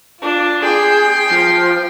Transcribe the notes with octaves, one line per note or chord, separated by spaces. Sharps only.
D4 F4
G#4 G5 C6
F3